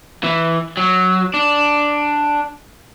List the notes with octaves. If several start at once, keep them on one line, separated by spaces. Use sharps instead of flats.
E3
F#3
D4